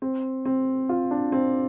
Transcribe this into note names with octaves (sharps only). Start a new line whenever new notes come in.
C4
C4
F4
D4
C4